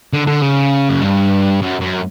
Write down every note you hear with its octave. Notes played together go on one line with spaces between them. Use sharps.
D3
D3
C#3
F#2
G2
F#2
F#2